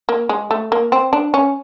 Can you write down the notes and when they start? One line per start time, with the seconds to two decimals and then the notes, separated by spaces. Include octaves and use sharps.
0.09 A#3
0.29 G#3
0.51 A3
0.72 A#3
0.92 C4
1.13 D4
1.34 C#4